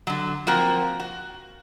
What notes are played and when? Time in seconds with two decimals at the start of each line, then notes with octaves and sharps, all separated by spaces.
0.07 D3 F#3
0.47 F3 A#3 C4 F#4 A#4
1.00 F#4